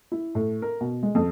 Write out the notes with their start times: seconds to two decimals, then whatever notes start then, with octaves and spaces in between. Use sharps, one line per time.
0.12 E4
0.35 A2
0.62 A#4
0.81 B2
1.03 G#3
1.15 F2